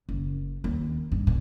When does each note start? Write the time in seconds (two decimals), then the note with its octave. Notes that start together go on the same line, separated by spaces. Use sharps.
0.09 F#1
0.64 D#2
1.12 G2
1.27 A#2